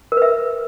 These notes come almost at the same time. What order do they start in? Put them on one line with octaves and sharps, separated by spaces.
A#4 B4 E5